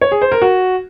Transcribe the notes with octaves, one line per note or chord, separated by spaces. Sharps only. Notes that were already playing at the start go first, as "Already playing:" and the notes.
C#5
G#4
C5
A#4
F#4